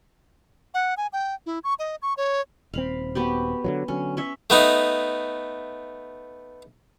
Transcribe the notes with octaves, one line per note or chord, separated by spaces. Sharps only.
F#5
G#5
G5
E4
C#6
D#5
C#6
C#5
D#1 C4 F5 B5
B3 F#4 G4
D3 D#3 F#3
D3 F#3 C#4
C#4 C#5 E5
A3 B3 D#4